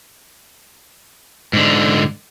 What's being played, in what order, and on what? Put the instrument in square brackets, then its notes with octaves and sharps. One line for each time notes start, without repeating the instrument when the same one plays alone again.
[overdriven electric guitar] G#2 D3